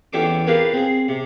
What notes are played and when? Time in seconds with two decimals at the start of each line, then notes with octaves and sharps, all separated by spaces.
0.13 E2 C#4 G4 A4 C#6 D6
0.47 F4 G4 G#4 A#4 B4 C#5
0.73 C4 G#4
1.08 C3